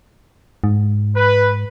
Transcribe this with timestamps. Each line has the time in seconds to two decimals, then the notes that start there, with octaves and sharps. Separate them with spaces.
0.64 G#2
1.16 B4